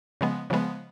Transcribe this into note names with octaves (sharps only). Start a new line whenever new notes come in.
C#3 F3 G#3 B3
C#3 F3 G#3 B3